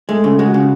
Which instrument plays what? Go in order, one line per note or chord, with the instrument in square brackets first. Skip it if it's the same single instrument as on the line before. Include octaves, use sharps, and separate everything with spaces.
[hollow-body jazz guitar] G#3 [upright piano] A3
[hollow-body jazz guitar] C#3 [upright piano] A3
[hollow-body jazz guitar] G#3 [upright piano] F#4
[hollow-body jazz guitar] C#3